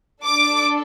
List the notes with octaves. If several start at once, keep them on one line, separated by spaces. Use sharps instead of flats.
D4 A4 D6